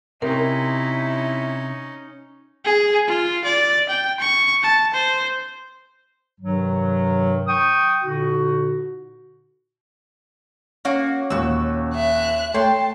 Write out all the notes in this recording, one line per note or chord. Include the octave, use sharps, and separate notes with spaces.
C3 C#4 D#4 E4 A#4
G#4
F4
D5
G5
C#6
A5
C5
G2 C3 D#3 F#3
G5 C#6 D#6
A#2 D3 D#4 F#4
A#3 C#4 F#4 C#5 F5
D#2 A#2 F#4 E6
E5 F#6
A3 C#5 G5 A5 C6